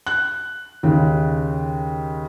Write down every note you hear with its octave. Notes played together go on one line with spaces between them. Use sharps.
F#6
D#2 C#3